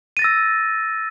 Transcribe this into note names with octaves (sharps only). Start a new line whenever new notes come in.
E6 A6 A#6 D#7